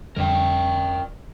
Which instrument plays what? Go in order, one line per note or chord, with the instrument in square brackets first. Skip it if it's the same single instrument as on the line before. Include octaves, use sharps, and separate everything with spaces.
[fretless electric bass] F2 D3 G3 [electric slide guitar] A#4 D5 G5